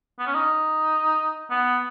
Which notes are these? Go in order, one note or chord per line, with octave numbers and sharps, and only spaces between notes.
B3
C#4
D#4
B3